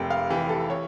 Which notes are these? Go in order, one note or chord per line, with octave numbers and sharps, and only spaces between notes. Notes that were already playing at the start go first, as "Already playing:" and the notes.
Already playing: F1 F2 A#3 G5
F5
E3 G4
A4
C#5